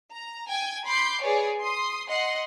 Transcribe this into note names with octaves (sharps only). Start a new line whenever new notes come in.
A#5
G5 G#5 G#6
B5 C6 D6 G6 C7
G#4 B4 C#5 D5
C6 D#6
D#5 F#5 C6